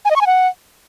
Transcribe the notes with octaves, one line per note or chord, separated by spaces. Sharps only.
G#5
D#5
C#6
G#5
F#5